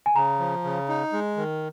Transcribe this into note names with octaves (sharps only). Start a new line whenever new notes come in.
G#5
C#3 A#5
F3
C#3
D#4
G#3
D#3